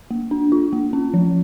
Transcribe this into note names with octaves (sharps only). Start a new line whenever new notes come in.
A#3
D4
F4
A#3
C#4
F3